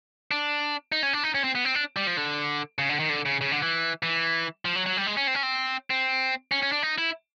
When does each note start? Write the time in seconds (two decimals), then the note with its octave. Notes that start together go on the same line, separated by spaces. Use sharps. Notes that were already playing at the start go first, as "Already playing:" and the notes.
0.31 D4
0.92 D#4
1.03 C#4
1.13 D4
1.24 D#4
1.35 C#4
1.44 C4
1.55 B3
1.65 C4
1.75 D4
1.97 G3
2.07 F3
2.17 D3
2.78 C#3
2.89 D3
3.00 D#3
3.10 D3
3.26 C#3
3.41 C#3
3.52 D3
3.62 E3
4.03 E3
4.65 F3
4.76 F#3
4.86 F#3
4.97 G3
5.07 G#3
5.17 C#4
5.27 C4
5.35 C#4
5.43 C4
5.90 C4
6.52 C#4
6.63 C#4
6.72 D4
6.83 D#4
6.98 E4